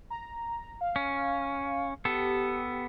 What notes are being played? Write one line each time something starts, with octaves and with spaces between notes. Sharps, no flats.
A#5
F5
C#4
B3 G4 A4